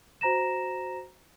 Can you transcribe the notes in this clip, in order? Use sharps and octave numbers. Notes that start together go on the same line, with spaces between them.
F#4 C5 A#5 A#6 E7